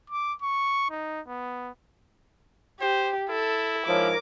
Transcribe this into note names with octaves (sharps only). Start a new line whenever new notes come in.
D6
C#6
D#4
B3
G4 C5
E4 A4
G#2 F3 A#4 C#5 D6